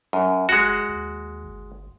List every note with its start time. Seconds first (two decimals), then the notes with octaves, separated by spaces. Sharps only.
0.13 F#2
0.49 F#1 G#3 F#4
0.89 D#2
1.45 G1